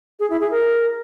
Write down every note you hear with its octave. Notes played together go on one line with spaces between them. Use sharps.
G#4
E4
G#4
A#4